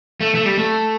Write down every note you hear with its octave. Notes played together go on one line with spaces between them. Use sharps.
A3
A3
G3
A3